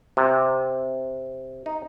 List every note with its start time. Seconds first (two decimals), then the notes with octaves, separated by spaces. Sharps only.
0.17 C3
1.66 D#4